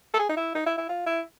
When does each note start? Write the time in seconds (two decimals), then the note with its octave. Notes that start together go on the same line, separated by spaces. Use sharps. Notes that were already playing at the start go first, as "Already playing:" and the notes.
0.14 A4
0.19 G#4
0.29 D#4
0.37 E4
0.55 D#4
0.66 E4
0.78 E4
0.89 F4
1.06 E4